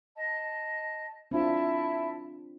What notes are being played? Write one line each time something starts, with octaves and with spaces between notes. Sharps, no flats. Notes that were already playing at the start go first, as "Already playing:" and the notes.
D#5 A5
C4 D4 E4 F4 E5 A5